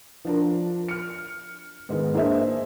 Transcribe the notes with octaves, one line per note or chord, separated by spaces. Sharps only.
F3 D4 A#4
F6 C#7
G#2 D#3 G#3 B3
A#3 D4 G#4 C5 D#5 E5